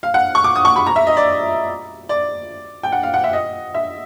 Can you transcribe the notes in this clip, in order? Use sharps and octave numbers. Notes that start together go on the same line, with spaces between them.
F5
F#5
C#6
D6
D#6
C#6
B5
A#5
E5
D#5
D5
D5
G5
F#5
F5
F#5
E5
D#5
E5